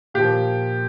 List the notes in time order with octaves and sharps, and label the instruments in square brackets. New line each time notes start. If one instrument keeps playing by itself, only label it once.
[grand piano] A#2 F3 G4